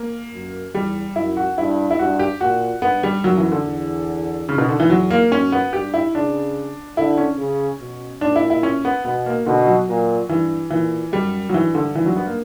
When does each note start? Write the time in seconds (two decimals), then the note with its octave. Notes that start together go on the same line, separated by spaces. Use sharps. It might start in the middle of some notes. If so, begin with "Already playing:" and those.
Already playing: A#3
0.33 F#2
0.75 E2 G3
1.16 F#2 E4
1.37 F#4
1.58 G2 E4
1.91 E4
1.99 G2 F#4
2.19 G4
2.41 A#2 F#4
2.82 G2 B3
3.03 G3
3.24 F#2 F#3
3.37 E3
3.52 D3
3.66 E2
4.49 C#3
4.58 B2
4.69 D3
4.80 E3
4.90 E2 F#3
5.10 A#3
5.31 F#2 C#4
5.52 B3
5.73 G2 G4
5.94 E4
6.15 C#3 D4
6.97 D3 E4
7.18 C#4
7.38 C#3
7.80 B2
8.21 A#2 D4
8.36 E4
8.50 E4
8.63 C#4
8.85 B3
9.05 B2 B3
9.26 A#3
9.46 B2 D3
9.67 F#3
9.88 A#2
10.29 G2 E3
10.70 A#2 E3
11.13 F#2 G3
11.49 F#3
11.54 G2 E3
11.75 D3
11.95 E3
12.06 F#3
12.16 B3
12.27 A#3